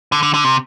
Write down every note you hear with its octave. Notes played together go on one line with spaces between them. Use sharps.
D3
D3
D3
C3